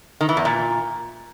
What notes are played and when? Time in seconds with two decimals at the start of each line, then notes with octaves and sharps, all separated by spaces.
0.21 D#3
0.29 E3
0.37 E2
0.45 A#2